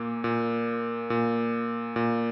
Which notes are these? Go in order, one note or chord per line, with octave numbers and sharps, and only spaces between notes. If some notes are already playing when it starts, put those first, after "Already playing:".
Already playing: A#2 A#3
A#2
A#2
A#2